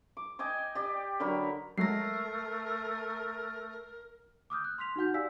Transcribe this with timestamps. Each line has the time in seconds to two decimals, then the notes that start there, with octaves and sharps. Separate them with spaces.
0.17 D6
0.39 D#5 G5 G#5 D6
0.75 G4 D5
1.20 D3 F#3 A#4 B5
1.78 F#3 G#3 A3 A#4 A#6 C7
4.50 D6 D#6 F6 G6
4.65 F#6
4.78 C6 F6 B6 F7
4.96 D#4 F#4 F#5 G6
5.14 G4 D5 F5 G#5 E6 B6